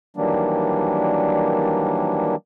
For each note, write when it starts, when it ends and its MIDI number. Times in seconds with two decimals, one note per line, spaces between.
0.17 2.36 51
0.17 2.36 52
0.17 2.36 54
0.17 2.36 55
0.17 2.36 58
0.17 2.36 62